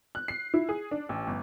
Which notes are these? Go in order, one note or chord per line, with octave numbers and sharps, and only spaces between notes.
F#6
C7
E4
G#4
D4
A1
G1